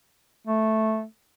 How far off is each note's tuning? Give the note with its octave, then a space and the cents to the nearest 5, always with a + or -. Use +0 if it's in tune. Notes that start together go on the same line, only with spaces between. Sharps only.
A3 -5